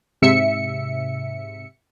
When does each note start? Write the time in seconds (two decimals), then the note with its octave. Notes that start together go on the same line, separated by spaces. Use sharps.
0.22 G#2 C3 E5 C#7